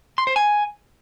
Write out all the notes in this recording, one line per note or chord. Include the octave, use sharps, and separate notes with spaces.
C6
C5
G#5